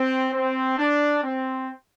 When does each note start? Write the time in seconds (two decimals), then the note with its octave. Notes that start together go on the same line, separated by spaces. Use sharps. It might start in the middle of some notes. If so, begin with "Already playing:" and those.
Already playing: C4
0.33 C4
0.78 D4
1.23 C4